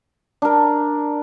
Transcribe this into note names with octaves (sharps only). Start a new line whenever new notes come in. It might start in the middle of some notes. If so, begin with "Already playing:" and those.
D4 A#4